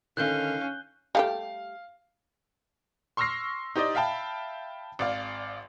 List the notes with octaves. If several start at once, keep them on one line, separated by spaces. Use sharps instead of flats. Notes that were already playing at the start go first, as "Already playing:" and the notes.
D3 D#3 C#4 F5 F#6 G6 G7
G3 A3 G4 F5
C6 C#6 E6 F6 A#6 C7
D#4 G4 C5 D5 D#5
E5 F5 G5 A5 B5
G#1 D5 F5